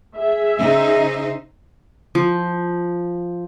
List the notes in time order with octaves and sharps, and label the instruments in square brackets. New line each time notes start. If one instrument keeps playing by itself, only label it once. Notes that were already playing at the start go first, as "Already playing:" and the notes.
[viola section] G#4 E5
[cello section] C#3 D#4 C5
[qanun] F3